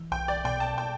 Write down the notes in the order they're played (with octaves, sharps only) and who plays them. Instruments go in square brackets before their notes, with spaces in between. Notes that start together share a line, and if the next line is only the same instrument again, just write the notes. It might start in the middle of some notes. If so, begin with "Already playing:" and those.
Already playing: [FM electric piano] E3
[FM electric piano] B1 [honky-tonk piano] G5
[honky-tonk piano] D5
[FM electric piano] B2 [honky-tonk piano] G5
[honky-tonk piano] A5
G5